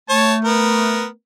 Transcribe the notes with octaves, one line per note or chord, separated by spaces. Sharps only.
A3 C#5 A5
B3 A#4